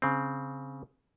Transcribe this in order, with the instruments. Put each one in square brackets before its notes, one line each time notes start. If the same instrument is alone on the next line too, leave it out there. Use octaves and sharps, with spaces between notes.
[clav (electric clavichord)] C#3 C4